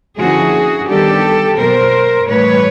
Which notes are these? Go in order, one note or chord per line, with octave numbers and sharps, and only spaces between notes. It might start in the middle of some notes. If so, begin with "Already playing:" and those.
D3 F3 A#3 C#4 E4 F#4 G#4
D#3 G3 B3 D4 G4 A4
B2 F#3 A#3 A#4 C5
A2 E3 G3 B4 C#5